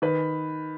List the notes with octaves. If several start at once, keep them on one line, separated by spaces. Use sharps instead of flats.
D#3 B4